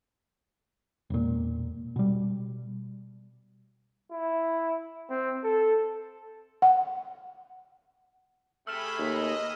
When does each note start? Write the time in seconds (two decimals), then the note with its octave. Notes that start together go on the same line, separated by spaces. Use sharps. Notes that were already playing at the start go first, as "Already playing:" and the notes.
1.10 E1 A#2
1.96 B2 G3
4.12 E4
5.10 C4
5.44 A4
6.62 F#5
8.67 C3 A3 G#4 B5 E6 F6 E7
8.99 D#2 D#5